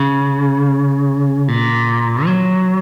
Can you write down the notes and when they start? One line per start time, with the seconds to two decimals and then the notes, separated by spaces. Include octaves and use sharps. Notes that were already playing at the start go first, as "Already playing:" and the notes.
Already playing: C#3
1.48 A#2
2.25 F#3